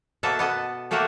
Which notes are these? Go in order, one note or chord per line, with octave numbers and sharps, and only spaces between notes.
B2 A#3 A4 E5 F#5 A5
B3 D#5 A5
A3 A#3 F#4 G4 E5 F#5